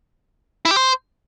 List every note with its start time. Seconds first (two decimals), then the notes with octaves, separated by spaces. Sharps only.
0.65 E4
0.71 G4
0.76 C5